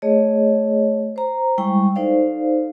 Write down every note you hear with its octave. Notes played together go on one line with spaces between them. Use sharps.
A3 G#4 C#5 D#5
C5 A#5
G3 G#3 E4 G5 C#6
D#4 A4 C5 D5 F5